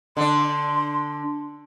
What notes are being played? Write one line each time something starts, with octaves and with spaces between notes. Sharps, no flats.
D3 D4 C6